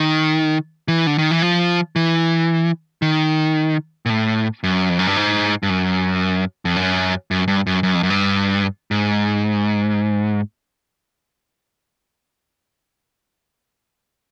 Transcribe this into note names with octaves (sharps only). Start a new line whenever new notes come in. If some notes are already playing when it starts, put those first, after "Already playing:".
Already playing: D#3
E3
D3
D#3
E3
F3
E3
D#3
A#2
A2
F#2
F2
F#2
G2
G#2
G2
F#2
F2
F#2
F#2
G2
F#2
F#2
F2
F#2
G2
G#2